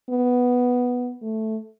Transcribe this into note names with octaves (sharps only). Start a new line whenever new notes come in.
B3
A3